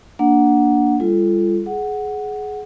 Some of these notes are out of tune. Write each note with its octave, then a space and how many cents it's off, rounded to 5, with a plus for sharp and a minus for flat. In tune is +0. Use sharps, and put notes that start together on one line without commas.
A#3 +0 D4 +0 F#5 -5
G3 +35 F4 -25 A4 -15
G#4 +20 F#5 +0